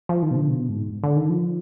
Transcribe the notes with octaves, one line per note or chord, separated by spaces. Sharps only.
F3
D#3
B2
D3
B2
G#2
D3
D#3
F3